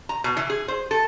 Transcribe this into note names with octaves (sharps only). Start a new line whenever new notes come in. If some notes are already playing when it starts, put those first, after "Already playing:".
A#5
B2
E3
G#4
C5
A4